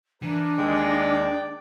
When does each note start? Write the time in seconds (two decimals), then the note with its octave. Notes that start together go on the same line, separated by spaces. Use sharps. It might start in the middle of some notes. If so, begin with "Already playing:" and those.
0.22 E3 D4 A#4
0.58 D#2 G#3 D5 G5